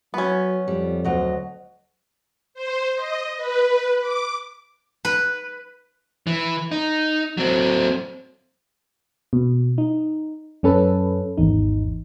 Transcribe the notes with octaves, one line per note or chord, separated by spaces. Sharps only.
F#3 B3 C#4
F2 G3
D2 F#3 D#5
C5
D#5
B4
D6
B4
E3
D#4
F#3 C4
B2
D#4
F#2 C#4 A4 B4
G#1 E2 D#4